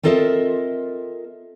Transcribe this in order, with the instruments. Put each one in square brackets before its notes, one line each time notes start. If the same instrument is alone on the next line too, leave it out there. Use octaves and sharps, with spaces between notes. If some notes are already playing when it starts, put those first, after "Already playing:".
[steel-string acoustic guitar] C4 F4 A4 A#4 D#5 E5